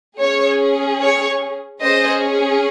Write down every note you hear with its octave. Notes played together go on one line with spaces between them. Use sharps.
C#4 G#4 C#5
C#5
C#4 G#4 C5 D#5